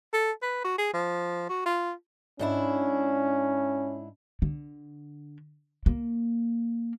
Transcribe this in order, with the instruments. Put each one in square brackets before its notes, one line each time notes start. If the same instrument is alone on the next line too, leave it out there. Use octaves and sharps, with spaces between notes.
[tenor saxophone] A4
B4
F#4
G#4
F3
F#4
F4
[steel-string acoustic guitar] G#2 D4 E4 [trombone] C#4
[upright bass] D3
A#3